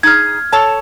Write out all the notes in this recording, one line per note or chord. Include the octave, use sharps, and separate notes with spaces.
D#4 G#4 F6 G#6
A4 C#5 A5